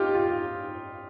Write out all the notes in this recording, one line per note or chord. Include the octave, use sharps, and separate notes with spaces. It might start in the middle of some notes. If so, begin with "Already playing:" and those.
Already playing: D#4 F4 G4
F4